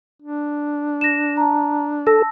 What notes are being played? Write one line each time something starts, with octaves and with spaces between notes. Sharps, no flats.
D4
A#6 E7
A5 A#5
A4 A5 E6 A#6